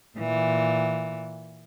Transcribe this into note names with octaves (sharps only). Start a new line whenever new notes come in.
A#2 E3